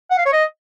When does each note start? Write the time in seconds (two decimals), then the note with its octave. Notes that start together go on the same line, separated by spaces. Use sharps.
0.11 F#5
0.18 F5
0.25 C#5
0.33 D#5